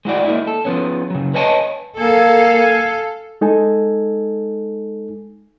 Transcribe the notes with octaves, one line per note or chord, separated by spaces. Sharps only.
G#3 E4 F#4 D5
A#3 D#4 E4
A4
F3 B3 C#4
C#3 F#3
B4 C#5 D#5 G#5 A5
A#3 A4 F5 G#5
G#3 D#4 A4 G#5